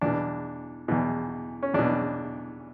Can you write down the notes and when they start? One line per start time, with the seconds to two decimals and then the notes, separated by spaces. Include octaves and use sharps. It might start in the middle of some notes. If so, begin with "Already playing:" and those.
0.01 E2 B2 D4
0.88 E2 B2
1.63 C#4
1.74 E2 B2 D4